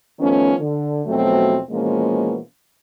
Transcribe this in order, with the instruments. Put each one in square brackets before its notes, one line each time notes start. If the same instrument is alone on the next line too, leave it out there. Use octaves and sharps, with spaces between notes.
[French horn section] D#3 F3 A3 B3 C#4
D3
E2 B2 F3 F#3 A3 C4
B2 E3 F3 G#3 A#3 C#4